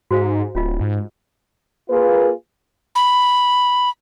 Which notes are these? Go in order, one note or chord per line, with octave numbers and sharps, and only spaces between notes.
G#2 F#4 C5 F5
D1 C#4 F4 D#5
G#2
A#3 F4 G#4 B4
B5